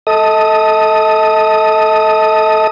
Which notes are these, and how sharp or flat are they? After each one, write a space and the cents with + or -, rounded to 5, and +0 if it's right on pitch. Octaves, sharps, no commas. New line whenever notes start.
A4 +0 D#5 +40 D#6 +0